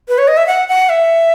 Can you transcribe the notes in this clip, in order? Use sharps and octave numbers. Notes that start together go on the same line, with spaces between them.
B4
C#5
D#5
E5
F#5
F#5
E5